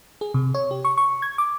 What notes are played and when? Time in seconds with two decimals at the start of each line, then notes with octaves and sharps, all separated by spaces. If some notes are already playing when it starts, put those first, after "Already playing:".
0.21 G#4
0.34 C3
0.54 C#5
0.71 G4
0.85 C#6
0.98 C#6
1.22 G#6
1.38 D6